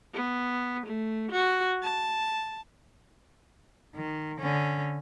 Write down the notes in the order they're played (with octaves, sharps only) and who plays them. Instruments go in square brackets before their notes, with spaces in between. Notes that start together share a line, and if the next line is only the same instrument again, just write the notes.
[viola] B3
A3
F#4
A5
[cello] D#3
D3 C#4